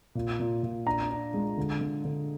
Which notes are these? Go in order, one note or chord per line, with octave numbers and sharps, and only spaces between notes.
A#2
A#2
A#2
D4 A#5
D4
G#3
D3
D3
D3